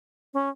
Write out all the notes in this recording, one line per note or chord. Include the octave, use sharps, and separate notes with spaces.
C#4